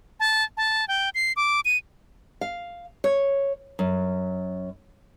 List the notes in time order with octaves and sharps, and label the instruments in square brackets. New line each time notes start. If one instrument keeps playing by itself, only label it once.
[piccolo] A5
A5
G5
C7
D6
D#7
[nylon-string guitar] F5
C#5
F#2